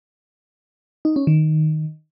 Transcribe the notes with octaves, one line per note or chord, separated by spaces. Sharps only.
D#4
C#4
D#3